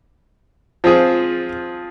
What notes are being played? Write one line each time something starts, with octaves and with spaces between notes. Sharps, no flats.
F3 C4 F4 G#4